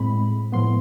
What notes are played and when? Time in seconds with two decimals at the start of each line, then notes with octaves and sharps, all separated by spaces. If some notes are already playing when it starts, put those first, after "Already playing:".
Already playing: A2 G#3 C4 B5
0.52 A2 F3 B3 C6